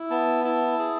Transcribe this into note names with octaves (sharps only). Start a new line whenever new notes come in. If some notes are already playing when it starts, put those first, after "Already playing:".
Already playing: E4
B3 A5
E4 A5
G#4